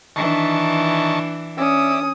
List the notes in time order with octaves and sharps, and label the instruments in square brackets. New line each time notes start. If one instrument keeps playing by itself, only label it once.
[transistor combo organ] D#3 A5 C#6 [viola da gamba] E3 D4
[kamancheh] C#4 D#6 [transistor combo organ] D5 E5